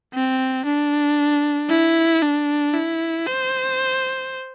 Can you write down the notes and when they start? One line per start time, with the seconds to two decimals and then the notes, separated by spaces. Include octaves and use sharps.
0.14 C4
0.65 D4
1.69 E4
2.22 D4
2.74 E4
3.26 C5